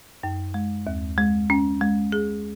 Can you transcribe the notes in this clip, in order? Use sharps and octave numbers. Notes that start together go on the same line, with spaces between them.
F#2
G#3
D#2
G#3
C#4
G#3
G#4